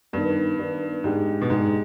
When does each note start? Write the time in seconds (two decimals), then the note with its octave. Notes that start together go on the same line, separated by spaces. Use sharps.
0.13 G2 D#3 B3 D4
0.59 D#3 B3 D4
1.04 G#2 G#3 D4 G4
1.42 B2
1.50 G#2 G#3 D4 G4